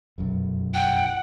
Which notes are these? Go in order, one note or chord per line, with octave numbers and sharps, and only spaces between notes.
F1 B1 F#2
F#5 G5